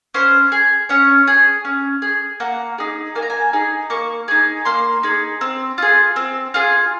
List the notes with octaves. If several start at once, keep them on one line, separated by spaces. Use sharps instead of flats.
C#4 C5
G#4
C#4 C#5
G#4
C#4
G#4
A#3 F#5
D#4 G#4
A#3 G#5
A#5
G#5
D#4 G#4
A#3 C#6
D#4 G#4
A#3 C6
D#4 G#4
C4
F4 G#4
C4
F4 G#4